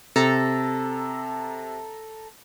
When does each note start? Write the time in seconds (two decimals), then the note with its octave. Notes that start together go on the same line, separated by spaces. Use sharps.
0.16 C3 A4 A#5